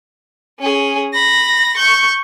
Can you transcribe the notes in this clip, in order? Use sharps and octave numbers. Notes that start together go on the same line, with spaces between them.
C#4 G#4
B5 A#6
C#6 G6